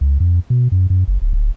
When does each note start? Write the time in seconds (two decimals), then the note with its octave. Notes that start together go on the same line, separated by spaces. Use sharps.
0.01 C#2
0.20 F2
0.50 B2
0.72 F#2
0.90 F#2
1.08 F#1
1.22 D1
1.33 D1